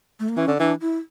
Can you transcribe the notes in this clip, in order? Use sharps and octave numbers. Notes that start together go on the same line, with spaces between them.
A3
A#3
E3 C#4
D3
E3 D4
E4